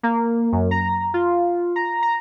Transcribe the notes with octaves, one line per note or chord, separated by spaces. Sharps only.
A#3
F#2
A#5
F4
A#5
A#5